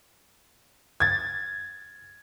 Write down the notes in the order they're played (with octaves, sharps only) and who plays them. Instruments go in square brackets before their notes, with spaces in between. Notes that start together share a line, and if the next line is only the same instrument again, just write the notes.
[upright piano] G#6 A6